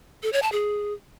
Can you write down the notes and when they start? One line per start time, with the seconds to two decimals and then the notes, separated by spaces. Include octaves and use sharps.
0.23 A4
0.33 C#5
0.42 A5
0.52 G#4